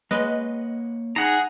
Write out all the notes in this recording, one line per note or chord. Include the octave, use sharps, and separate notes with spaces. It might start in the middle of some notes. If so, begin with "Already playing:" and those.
G#3 A#3 B4 C#5 D#5 F#5
D#4 G#4 F#5 A#5